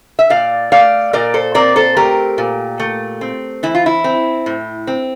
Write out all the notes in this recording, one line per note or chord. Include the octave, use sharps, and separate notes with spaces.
E5
A#2 D5 F5
A3 D5 F5
A#2 A#4 D5
A4 C5
C4 A#4 D5
A4 C5
A3 G4 A#4
A#2
A3
C4
E3 E4
F4
E4
C4
A2
C4